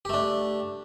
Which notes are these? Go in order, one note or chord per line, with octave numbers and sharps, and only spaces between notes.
A3 D4 G4